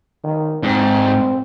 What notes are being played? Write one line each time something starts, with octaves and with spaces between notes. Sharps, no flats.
D#3
G#2 C4